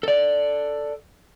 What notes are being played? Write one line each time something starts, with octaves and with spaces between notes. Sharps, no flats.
A4 D5